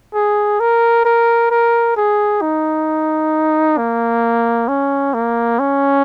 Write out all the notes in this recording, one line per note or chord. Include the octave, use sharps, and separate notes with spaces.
G#4
A#4
A#4
A#4
G#4
D#4
A#3
C#4
A#3
C#4